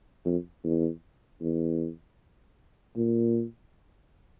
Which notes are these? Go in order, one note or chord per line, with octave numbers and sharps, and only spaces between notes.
F2
E2
E2
A#2